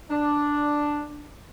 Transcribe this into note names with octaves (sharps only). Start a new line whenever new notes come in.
D4